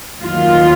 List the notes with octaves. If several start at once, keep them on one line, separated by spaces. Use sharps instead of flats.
D#2 D#3 F#3 F4